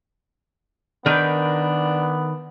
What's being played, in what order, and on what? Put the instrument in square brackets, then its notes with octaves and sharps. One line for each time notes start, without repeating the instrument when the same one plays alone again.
[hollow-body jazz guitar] D#3 [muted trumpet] B3 [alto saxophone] D4 [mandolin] A#4 B4 G6